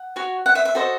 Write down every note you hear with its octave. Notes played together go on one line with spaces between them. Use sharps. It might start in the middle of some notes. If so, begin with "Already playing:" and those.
Already playing: F#5
F#4 C#5
F#5
E5
E5
F#4 A4 C5 D#5